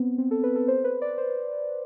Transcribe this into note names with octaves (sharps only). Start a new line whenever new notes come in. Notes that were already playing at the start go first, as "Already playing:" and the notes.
Already playing: B3 C4
C4
A4
B4
A4
C5
B4
D5
C5